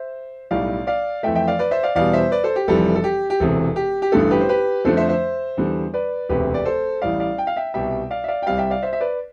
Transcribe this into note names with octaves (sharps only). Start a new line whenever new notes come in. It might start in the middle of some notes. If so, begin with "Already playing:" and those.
Already playing: C5 E5
B1 A2 G3 D5 F5
D5 F5
F2 E3 A3 E5 G5
E5 G5
D5 F5
B4 D5
C5 E5
D5 F5
E2 B2 G3 D5 F5
C5 E5
B4 D5
A4 C5
G4
F1 F2 E3 G3 A4
A4
G4
G4
E1 E2 C3 A4
G4
G4
A1 G2 D3 A3 A4
G4 B4
C5
G4 B4
F2 D3 F3 A3 A4 C5
C5 E5
C5 E5
E2 D3 G3
B4 D5
E1 D2 C3 G4 B4
D5
A4 C5
A1 A2 G3 D5 F5
D5 F5
G5
F5
E5 G5
C2 B2 G3 E5 G5
D5 F5
E5
D5 F5
G5
C2 C3 G3 D5 F5
E5 G5
D5 F5
C5 E5
E5
B4 D5